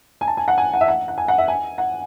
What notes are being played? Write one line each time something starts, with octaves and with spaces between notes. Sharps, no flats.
G#5
A5
G#5
F#5
G#5
F#5
E5
F#5
F#5
G#5
F#5
E5
G#5
F#5